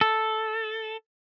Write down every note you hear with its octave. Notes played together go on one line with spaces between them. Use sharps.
A4